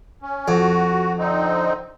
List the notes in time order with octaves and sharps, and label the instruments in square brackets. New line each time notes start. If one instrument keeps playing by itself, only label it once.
[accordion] C#4
[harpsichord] F2 [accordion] F#4
[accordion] D3 C4 D#4